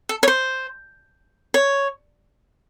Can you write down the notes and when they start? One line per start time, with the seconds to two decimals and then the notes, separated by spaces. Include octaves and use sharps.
0.09 A4
0.23 C#5
0.28 C5
1.54 C#5